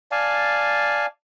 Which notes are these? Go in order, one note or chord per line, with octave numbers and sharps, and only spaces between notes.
D5 F5 G#5 A5